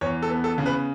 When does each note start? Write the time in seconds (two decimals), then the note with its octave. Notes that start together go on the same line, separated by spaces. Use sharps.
0.01 E2 C#5
0.22 A4
0.30 B3
0.44 A4
0.58 C#3
0.66 B4